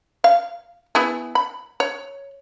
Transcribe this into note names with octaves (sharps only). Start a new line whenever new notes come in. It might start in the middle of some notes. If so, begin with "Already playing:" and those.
F5
B3 E4 G#4
B5
C#5